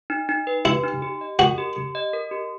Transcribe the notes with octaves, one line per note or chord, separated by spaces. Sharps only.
D#4
D#4
B4
E4 G4
D#4
G4
D#5
F#4 A#4
G4
G4
D#5
A#4
G4